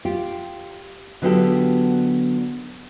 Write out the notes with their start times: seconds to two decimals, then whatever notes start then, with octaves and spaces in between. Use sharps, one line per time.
0.05 F4 G4
1.22 D3 F#3 B3 F4 G4 A4